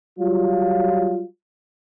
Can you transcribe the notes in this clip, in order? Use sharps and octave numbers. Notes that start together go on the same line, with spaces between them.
F#3 G3 F4